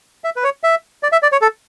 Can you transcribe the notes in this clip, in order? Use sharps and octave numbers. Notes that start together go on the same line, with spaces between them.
E5
B4
C#5
E5
D5
E5
D5
C#5
A4